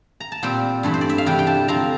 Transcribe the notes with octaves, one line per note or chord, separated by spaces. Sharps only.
A#5
A5
A#2 G3 C4 G5
G2 E3 A3 E4
C5
D5
E5
F5
E2 C3 G3 D4 G5
G5
A5
D3 F3 C4 A#5